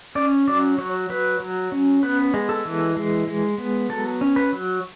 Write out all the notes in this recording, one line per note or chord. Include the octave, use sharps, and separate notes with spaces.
C#4 D5
F#3 D5
F#3 C#5
F#3 B4
F#3
C#4
B3 B4
G#3
A4
E3
G#3
G#3
B3
F#3 A4
C#4
B4
F#3